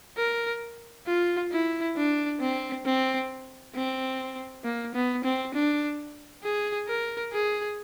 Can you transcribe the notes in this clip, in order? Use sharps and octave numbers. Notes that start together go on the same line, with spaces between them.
A#4
F4
E4
D4
C4
C4
C4
A#3
B3
C4
D4
G#4
A#4
G#4